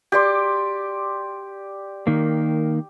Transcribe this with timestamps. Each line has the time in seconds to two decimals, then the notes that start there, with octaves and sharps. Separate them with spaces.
0.12 G4 D5 C6
2.07 D#3 A#3